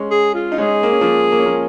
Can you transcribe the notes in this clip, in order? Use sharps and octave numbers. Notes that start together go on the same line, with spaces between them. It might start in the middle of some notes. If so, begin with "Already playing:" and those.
Already playing: G#3 C#4
G#4
F4
D#4
G#3 C#4 G#4
A#3
C#4
F3 A#3
A#3
C#4
F3 A#3